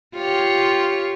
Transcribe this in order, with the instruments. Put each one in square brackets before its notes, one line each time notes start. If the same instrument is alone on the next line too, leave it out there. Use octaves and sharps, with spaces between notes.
[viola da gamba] F4 G4 C#5